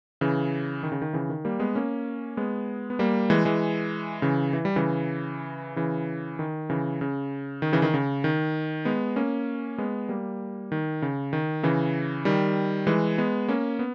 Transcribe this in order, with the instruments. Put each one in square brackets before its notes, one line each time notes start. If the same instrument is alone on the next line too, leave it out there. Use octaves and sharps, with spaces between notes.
[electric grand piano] C#3 E3
D#3
C#3
D#3
C#3 E3
D#3
G3 A#3
G#3 B3
A#3 C#4
G#3 B3
B3
G3 A#3
E3 G#3
E3 G#3
C#3 E3
E3
G3
C#3 E3
C#3 E3
D#3
C#3 E3
C#3
D#3
C#3 E3
D#3
C#3
D#3
G#3 B3
A#3 C#4
G#3 B3
G3 A#3
D#3
C#3
D#3
C#3 E3
D#3 G3
E3 G#3
G#3 B3
A#3 C#4
B3